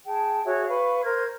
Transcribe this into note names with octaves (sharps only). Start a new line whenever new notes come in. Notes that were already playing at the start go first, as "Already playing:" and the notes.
G#4 G5 A5
F#4 G#4 C#5 E5
B4 F5 C#6
A#4 C5 G#6